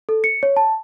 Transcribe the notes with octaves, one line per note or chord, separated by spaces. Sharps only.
A4
C#7
C#5
A5